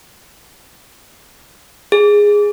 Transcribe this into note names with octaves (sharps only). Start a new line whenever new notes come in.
G#4